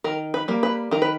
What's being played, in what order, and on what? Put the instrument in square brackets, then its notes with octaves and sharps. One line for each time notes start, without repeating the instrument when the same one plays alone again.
[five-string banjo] D#3 A#4
B4
G3 A#3
B4
D#3 A#4
B4